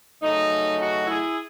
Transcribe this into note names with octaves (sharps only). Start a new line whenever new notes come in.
C#3 F#3 A3 D#4
D#4 F#4
E4 G#4